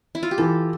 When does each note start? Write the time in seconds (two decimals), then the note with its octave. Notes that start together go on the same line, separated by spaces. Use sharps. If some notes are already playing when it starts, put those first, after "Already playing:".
0.15 E4
0.23 F4
0.31 G4
0.38 E3 A4